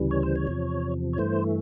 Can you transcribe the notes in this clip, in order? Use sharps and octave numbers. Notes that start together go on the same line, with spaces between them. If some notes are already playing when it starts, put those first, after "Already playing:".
Already playing: D2 C#3 E3 G3
C#5
C5
C#5
E2 C3 F3
C#5
G2 E3 A3 C5